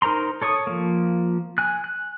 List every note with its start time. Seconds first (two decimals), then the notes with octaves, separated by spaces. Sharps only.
0.02 D#4 A#4 C5 A#5 C6
0.42 A4 C#5 C#6 D#6
0.67 F3 A#3
1.58 G#5 F#6
1.84 F#6